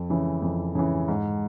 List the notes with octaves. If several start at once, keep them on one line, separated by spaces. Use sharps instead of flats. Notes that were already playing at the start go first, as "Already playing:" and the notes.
Already playing: F2
C#3 E3
F2
C#3 E3
G#2